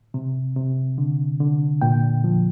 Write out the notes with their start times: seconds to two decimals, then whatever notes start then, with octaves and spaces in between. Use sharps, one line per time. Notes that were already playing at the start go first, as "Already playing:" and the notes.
0.14 C3
0.56 C3
0.98 D3
1.40 D3
1.82 A#2 G5
2.24 F3